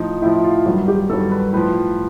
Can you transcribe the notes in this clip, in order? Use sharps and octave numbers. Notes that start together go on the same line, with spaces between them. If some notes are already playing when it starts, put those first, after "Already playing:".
Already playing: A2 F3 D#4
A2 F3 E4
F4
G2 D#3 F#3 F#4
G4
G2 D#3 F#3 A4
B4
A2 F3 B4